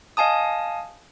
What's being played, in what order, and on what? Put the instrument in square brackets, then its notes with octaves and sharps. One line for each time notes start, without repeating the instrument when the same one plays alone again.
[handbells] D#5 F5 G#5 A5 D#6